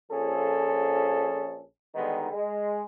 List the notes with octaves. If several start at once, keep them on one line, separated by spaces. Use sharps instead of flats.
A#1 F3 C#4 G#4 A4
D3 D#3 G3 G#3 B3 D#4
G#3